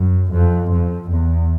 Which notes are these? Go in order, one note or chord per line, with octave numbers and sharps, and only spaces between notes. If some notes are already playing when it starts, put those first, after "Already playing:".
Already playing: F#2
F2
F2
E2